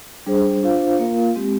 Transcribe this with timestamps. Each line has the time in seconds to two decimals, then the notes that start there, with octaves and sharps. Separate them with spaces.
0.26 G3 D4 G#4 C5
0.63 D4 F4 C5 F5
0.99 A#3 F4 A#4 F5
1.36 G#3 C4 G4